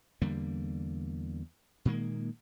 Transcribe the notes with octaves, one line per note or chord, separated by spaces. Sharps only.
E2 D3 G3 A#3
A#2 D#3 G#3 A#3